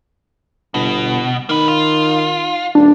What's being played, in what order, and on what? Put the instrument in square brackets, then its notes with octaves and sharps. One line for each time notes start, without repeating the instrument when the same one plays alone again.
[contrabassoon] G1 [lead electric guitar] B2
[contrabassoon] D#3 [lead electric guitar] A#3 B4
[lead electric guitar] F4
[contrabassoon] D#1 [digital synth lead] D4